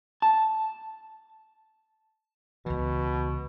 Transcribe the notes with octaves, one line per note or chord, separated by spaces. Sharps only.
A5
C#2 B2 E3